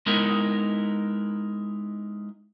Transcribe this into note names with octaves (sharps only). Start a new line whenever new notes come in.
G#3 B3 D#4 E4 A#4